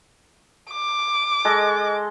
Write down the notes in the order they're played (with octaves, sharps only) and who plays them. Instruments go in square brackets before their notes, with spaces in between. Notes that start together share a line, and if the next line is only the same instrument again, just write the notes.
[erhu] D6
[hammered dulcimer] G#3 A4 D#5